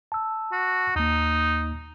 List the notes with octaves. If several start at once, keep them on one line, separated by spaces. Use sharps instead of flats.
A5 E6
F#4
D#2 A#3 D#4